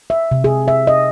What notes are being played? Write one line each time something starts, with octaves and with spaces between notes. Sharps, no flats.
E5
C3
G#4
E5
D#5